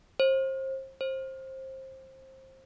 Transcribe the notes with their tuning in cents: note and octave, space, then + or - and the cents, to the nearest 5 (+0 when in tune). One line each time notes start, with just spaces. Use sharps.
C5 +30
C5 +20